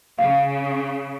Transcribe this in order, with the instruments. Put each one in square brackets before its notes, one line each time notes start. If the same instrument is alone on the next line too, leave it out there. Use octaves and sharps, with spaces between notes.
[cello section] C#3 [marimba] F5